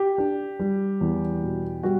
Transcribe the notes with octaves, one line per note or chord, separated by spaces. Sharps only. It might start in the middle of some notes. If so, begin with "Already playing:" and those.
Already playing: G4
D4
G3
E2
B2
G3 F#4